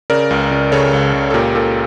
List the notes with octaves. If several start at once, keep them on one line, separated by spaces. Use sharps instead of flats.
C#3 A#4 D5
C#2
C#2
C#3 A4 C#5
C#2
C#2
A4
A#2 G4 A#4
A#2 A4